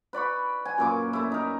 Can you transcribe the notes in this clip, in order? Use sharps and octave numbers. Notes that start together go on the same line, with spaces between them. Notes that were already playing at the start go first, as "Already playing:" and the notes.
B4 D5 B5 C#6
G#5
F#2 A#2 D6
A3 E4
D#4 A#4